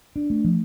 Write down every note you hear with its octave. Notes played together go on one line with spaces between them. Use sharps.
D4
A3
F3